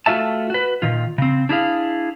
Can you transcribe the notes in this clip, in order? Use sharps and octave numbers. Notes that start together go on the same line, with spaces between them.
A3 F4 F#4 E5 A5
F#4 B4
A#2 D#3 F4
C#3 C4
D4 E4 G#4 F5